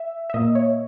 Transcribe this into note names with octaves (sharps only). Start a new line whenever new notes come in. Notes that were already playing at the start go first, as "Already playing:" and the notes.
Already playing: E5
E5
A#2 A#3 D#5
C#5